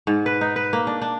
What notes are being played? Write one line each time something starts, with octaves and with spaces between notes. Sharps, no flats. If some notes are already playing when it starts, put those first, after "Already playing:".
G#2
B4
D#4
B4
A#3
D4
D4